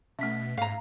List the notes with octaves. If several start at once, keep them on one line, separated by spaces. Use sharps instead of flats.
B2 A3 C#4 E5 B6
G#2 F5 A#5